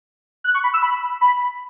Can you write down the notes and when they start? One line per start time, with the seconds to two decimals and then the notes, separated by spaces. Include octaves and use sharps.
0.44 F#6
0.54 C#6
0.64 B5
0.74 E6
0.83 B5
1.21 B5